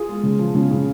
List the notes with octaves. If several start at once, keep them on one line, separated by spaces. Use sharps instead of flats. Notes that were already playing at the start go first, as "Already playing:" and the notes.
Already playing: F4 G#4
G#3
C#3
F3
C#3
C#3